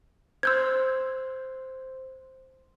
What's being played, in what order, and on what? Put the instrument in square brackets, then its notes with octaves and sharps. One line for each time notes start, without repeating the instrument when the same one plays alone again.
[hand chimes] C5 C6 [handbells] E6 G6 G#6